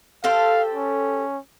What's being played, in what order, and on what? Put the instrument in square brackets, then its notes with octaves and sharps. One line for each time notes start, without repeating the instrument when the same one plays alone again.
[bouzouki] G4 A4 C5 [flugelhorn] F5
[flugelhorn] C#4